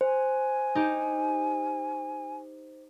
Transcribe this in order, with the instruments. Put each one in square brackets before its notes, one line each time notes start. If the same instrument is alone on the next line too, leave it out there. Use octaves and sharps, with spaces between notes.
[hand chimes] C5 [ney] G#5
[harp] D#4 G4